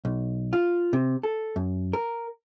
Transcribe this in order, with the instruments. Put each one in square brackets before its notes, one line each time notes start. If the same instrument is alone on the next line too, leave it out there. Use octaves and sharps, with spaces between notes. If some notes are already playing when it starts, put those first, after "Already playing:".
[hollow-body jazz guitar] B1
F4
C3
A4
F#2
A#4